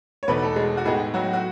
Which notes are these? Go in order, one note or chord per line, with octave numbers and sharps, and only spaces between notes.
C#5
E2 B2 A3 B3 D#4 B4
A3 A4
G#3 G#4
F#4
A2 G#3 B3 D#4 G#4
F#3 F#4
F#4